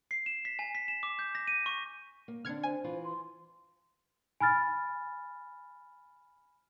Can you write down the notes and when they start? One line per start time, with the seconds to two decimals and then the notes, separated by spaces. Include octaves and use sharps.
0.11 C7
0.26 E7
0.45 B6
0.59 G#5
0.75 B6
0.88 E7
1.03 D6
1.19 G6
1.35 A#6
1.48 D#7
1.66 C#6
2.28 A#3
2.45 D3 C4 D4 F6 G#6 C#7
2.63 C5 G#5
2.84 E3 F4
3.04 C6
4.40 G#5 B5 F6 A6